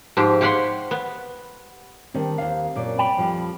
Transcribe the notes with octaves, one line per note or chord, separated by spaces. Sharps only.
G#2 F3 G4
G4 C#5 F5 F#5 B5 C6
B3
D#3 G3 C4 D4
D#2 C5 F5
F#2 A#2 D5
G5 B5
F2 F3 G3